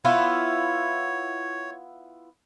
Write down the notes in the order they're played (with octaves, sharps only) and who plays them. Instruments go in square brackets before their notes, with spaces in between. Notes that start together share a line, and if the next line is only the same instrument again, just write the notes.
[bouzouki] B3 E4 F4 [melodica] C#5